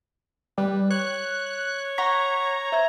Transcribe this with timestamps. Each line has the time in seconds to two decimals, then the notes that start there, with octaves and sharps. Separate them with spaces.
0.58 G3 B4
0.91 C#5 F#6
1.98 F#5 A#5 C#6 B6
2.72 C5 E5 G#6